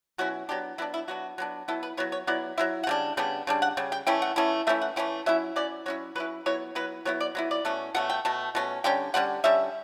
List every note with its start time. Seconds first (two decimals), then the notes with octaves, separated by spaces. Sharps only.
0.18 B2 F#3 C#4 E4 F#4
0.49 F#3 B3 D4 G4
0.78 F#3 B3 D4 E4
0.94 E4
1.08 F#3 B3 D4 F#4
1.38 F#3 B3 D4
1.68 F#3 B3 E4 A4
1.83 B4
1.97 F#3 B3 E4 C#5
2.12 C#5
2.27 F#3 B3 E4 D5
2.58 F#3 B3 E4 E5
2.83 F#5
2.87 C#3 G3 D4
3.17 C#3 G3 B3 D4
3.47 C#3 G3 D4
3.62 F#5
3.77 C#3 G3
3.92 G5
4.07 E3 A3 C#4 E4 G5
4.22 F#5
4.36 E3 A3 C#4 E4
4.67 E3 A3 C#4 E4 E5
4.82 F#5
4.96 E3 A3 C#4 E4 G5
5.26 F#3 C#4 E4 E5
5.56 F#3 C#4 E4 D5
5.86 F#3 C#4 E4 C#5
6.15 F#3 C#4 E4 B4
6.46 F#3 B3 E4 C#5
6.75 F#3 B3 E4 B4
7.05 F#3 B3 E4 C#5
7.20 D5
7.35 F#3 B3 E4
7.51 D5
7.65 B2 A3 C#4
7.95 B2 A3 C#4 F#5
8.10 G5
8.25 B2 A3 A5
8.55 B2 A3 C#4
8.84 D3 G3 C#4 G5
9.14 D3 G3 C#4 F#5
9.44 D3 G3 C#4 E5